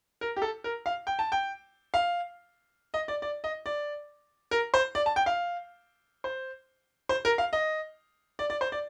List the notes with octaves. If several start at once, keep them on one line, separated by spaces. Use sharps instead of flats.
A#4
G4
A4
A#4
F5
G5
A5
G5
F5
D#5
D5
D5
D#5
D5
A#4
C5
D5
A5
G5
F5
C5
C5
A#4
F5
D#5
D5
D5
C5
D5